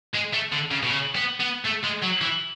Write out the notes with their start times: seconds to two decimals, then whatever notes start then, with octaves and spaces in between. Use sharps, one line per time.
0.15 G#3
0.34 A3
0.52 D3
0.71 C#3
0.83 B2
0.90 C#3
1.16 B3
1.40 B3
1.66 A3
1.84 G#3
2.03 F#3
2.22 E3